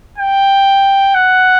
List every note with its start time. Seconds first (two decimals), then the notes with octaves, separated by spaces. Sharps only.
0.18 G5
1.14 F#5